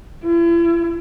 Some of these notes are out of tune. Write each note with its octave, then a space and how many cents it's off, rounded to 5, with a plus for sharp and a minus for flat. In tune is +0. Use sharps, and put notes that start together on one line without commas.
E4 +40